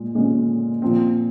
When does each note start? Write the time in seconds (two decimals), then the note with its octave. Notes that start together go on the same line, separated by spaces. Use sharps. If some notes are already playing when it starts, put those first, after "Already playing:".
Already playing: A#2 G#3
0.15 A#2 G#3 C#4
0.82 A#2 F3 C4